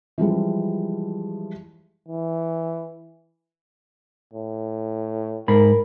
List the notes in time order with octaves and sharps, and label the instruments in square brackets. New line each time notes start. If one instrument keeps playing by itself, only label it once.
[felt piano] E3 F3 G3 G#3
[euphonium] E3
A2
[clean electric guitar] G#2 B5 [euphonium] A#4